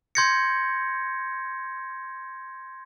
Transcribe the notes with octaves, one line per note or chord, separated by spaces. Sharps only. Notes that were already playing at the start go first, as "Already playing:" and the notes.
C6 G6 G#6 A#6 C#7